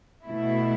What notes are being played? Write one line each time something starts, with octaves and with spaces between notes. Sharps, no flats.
B2 A3 E4